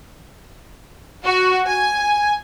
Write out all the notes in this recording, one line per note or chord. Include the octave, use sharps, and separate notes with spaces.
F#4
G#5